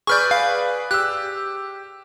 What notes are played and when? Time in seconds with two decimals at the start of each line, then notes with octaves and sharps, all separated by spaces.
0.07 G#4 B4 D5 C#6 F6 G6
0.31 F5
0.91 G4 E6 F#6